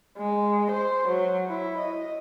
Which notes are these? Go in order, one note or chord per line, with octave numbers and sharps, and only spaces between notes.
G#3
C5
F#3
E4
D#5